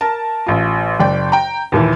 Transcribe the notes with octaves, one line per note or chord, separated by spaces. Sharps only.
A#4 A5
A1 F4
F#1 D5 G5
G5 A#5
D#2 A#2 E3